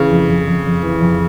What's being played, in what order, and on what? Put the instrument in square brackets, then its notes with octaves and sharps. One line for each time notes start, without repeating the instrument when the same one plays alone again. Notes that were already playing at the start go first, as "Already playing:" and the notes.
Already playing: [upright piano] C#3 [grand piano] E3
[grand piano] F2
F2
F2
F2
E3
F2